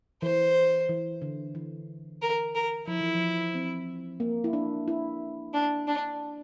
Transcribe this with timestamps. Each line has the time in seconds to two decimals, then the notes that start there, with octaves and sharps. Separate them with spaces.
0.22 E3 C5
0.89 E3
1.22 D3
1.55 E3
2.22 A#4
2.55 A#4
2.88 F3 E4
3.01 E3
3.15 F3
3.55 C4
4.20 A#3
4.44 E4
4.53 D4
4.88 E4
5.53 D4
5.87 D4